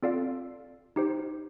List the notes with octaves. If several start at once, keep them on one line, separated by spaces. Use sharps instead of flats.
C4 F4 A4 D5 F5
D#4 G4 C5